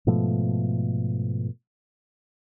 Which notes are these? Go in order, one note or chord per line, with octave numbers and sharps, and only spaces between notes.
G#2 B2 F3 A3